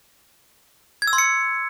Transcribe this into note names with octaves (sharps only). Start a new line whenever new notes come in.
G#6
E6
C6
C#7